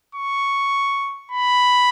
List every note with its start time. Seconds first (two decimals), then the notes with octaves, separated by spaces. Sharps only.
0.15 C#6
1.31 B5